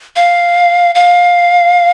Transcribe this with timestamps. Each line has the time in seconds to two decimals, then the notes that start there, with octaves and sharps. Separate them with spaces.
0.16 F5
0.95 F5